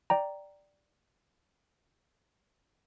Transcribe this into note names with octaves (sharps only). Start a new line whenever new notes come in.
D5 G5 A#5